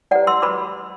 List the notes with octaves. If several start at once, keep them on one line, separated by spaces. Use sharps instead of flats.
E4 G4 B4 D5 F#5
C6 E6
F#4 B4 B5 D6